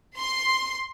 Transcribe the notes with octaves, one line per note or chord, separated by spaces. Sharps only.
C6